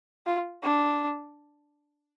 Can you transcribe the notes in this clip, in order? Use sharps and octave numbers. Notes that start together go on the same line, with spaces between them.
F4
D4